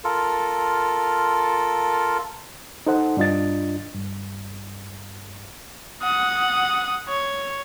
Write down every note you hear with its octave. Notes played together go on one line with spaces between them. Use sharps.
F4 A4 A#4
D#4 A4 C5 F#5
G2 D4 F4 D#5 A6
G2
F#5 D#6
C#5